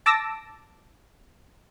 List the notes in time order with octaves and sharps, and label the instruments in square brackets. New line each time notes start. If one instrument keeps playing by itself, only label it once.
[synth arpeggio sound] A5 D6 E6 A#6